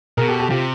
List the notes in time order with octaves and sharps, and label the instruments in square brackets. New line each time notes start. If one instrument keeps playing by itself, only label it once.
[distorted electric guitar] B2 [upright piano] G#4 A#4
[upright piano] G4 A4
G4 A4
[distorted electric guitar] C3 [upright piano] F4 G4